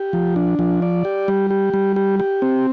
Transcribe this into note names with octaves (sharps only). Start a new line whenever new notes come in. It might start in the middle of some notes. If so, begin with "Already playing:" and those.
Already playing: G4
F3
D4
F3
D5
G4
G3
G4
G3
G4
G4
C4